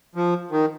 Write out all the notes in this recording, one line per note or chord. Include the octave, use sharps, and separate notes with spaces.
F3
D#3